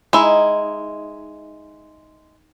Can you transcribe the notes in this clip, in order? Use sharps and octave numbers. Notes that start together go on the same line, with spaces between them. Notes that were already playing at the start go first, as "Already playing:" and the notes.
G#3 D#4 E4